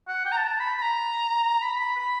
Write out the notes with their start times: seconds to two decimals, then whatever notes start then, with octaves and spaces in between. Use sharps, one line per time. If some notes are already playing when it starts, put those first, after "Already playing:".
0.08 F#5
0.25 G5
0.32 A#5
0.37 A5
0.49 A5
0.60 B5
0.78 B5
0.82 A#5
1.62 B5
1.79 B5
1.96 B5